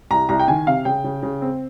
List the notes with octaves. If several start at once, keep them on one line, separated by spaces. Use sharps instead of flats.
C2 A#5
C2 A#5
G5
D#3 G#5
C3 F5
C#3 G5
C#3
C#3
C4